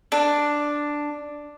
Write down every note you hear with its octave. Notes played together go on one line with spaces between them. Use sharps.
D4